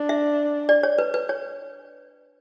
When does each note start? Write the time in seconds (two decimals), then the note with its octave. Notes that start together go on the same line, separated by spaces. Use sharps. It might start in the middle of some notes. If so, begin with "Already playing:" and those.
Already playing: D4
0.09 E5
0.69 D5
0.83 C#5
0.99 B4
1.14 B4
1.29 C#5